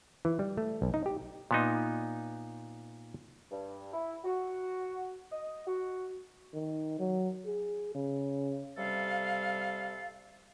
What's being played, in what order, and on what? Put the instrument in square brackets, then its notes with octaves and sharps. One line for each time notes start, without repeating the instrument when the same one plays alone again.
[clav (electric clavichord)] E3
G3
A3
B1
D#4
G4
A#2 B3 D#4
[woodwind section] G2
E4
F#4
D#5
F#4
[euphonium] D#3
F#3
G#4
C#3
[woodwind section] C3 G3 A4 F5